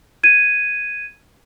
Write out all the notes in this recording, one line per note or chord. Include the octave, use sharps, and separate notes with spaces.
G#6 D#7